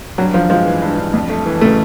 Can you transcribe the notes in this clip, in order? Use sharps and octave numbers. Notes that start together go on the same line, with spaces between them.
G2 F#3
G2 F3
F3 G#3
E3
G2
G2
F2
A3
E3
C#3 A3